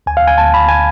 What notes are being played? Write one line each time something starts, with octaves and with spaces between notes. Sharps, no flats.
D2 G#5
F5
D2
G#5
D2 A5
D2 B5
G#5